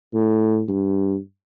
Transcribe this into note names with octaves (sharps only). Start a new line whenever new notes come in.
A2
G2